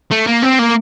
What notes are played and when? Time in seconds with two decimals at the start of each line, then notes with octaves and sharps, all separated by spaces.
0.11 A3
0.27 A#3
0.42 C4
0.59 A#3